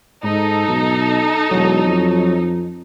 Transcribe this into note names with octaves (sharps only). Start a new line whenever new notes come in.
G#2 D#4 A4
B1
E1 F#3
F2